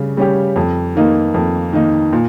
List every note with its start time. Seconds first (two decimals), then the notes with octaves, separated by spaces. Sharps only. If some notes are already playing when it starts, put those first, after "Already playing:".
Already playing: C#3 G3
0.17 G3 C#4 G4
0.56 F2
0.95 D#3 A#3 D#4
1.34 F2
1.73 D#3 A#3 D#4
2.13 A#2